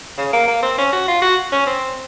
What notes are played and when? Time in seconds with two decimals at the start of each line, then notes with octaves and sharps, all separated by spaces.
0.17 C#3
0.33 A#3
0.48 A#3
0.63 C4
0.78 C#4
0.92 F#4
1.08 F4
1.22 F#4
1.52 C#4
1.66 C4